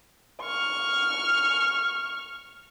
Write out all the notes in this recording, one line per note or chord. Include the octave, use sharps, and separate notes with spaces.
C#6 F6